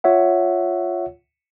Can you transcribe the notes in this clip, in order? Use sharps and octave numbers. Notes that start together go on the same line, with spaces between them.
F4 C#5 E5 F#5